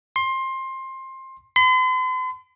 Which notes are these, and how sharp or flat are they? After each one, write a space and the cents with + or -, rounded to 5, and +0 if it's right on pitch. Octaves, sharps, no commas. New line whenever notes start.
C6 +20
C6 -45